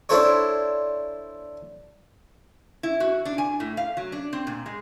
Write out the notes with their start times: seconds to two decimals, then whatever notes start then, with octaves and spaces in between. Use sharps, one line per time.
0.09 D4 E4 A4 C5 C#5
2.83 E4
3.00 F#4
3.25 D4
3.38 G#5
3.60 A2
3.77 F5
3.97 F#3
4.12 D4
4.33 C4
4.47 A#2
4.66 G#3